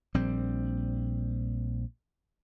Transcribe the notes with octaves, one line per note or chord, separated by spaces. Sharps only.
A#1 G3 C4